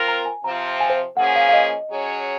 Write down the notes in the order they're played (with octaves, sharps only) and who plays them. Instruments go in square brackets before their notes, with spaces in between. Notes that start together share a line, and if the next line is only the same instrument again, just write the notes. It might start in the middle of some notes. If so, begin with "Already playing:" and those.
Already playing: [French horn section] C4 F4 A#4
[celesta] A#5
G#5
[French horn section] C3 F3 C4 F4 [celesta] A#5
[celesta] G#5
C5
[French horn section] F3 A#3 C#4 G#4 [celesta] F#5
[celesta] F5
F5
D#5
[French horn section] F#3 C#4 G#4 C#5